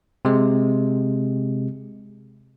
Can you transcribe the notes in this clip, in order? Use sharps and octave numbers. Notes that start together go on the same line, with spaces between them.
C3 G#3